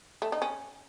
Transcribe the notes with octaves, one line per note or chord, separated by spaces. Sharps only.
A3
D#4
C#4